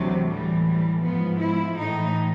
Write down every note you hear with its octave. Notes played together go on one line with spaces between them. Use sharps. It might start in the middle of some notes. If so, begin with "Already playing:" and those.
Already playing: D2 C3 E3 F#3
A2 E3 G3
G3
G#2 F3 B3
E4
A2 E3 D#4